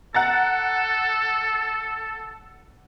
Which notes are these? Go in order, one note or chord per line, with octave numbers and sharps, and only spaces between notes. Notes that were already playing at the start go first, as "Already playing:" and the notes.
A4 F#5 A#5 A6